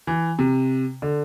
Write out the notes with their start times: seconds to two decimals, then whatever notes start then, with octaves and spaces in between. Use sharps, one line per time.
0.07 E3
0.39 C3
1.02 D3